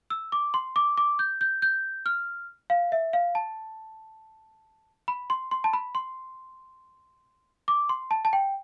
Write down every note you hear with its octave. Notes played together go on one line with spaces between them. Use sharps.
E6
D6
C6
D6
D6
G6
G6
G6
F6
F5
E5
F5
A5
B5
C6
C6
A5
B5
C6
D6
C6
A5
A5
G5